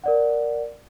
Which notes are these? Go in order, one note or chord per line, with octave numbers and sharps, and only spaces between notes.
A#4 D5 F#5